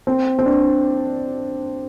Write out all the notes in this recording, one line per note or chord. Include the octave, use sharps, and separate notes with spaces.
C4
C4
D4